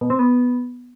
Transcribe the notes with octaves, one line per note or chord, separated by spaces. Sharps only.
B2
C4
B3